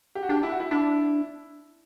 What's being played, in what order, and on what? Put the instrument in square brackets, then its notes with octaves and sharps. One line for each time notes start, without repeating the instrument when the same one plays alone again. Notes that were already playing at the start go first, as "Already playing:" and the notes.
[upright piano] G4
F#4
[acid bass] D4 [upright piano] G4
[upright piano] E4
F#4
E4
[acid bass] D4 [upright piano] E4